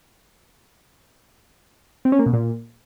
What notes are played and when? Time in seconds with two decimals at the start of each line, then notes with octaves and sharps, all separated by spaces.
2.05 C4
2.12 C#4
2.19 A#3
2.26 B2
2.33 A#2